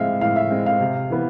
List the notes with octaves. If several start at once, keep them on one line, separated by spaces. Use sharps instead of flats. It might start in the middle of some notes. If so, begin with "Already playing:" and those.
Already playing: A2 G#3 C4 E5 F5
A2 F5
E5
G#3 C4
F5
C3
E3 B3